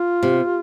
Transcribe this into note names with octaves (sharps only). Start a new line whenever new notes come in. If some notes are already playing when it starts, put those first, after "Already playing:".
Already playing: F4
C3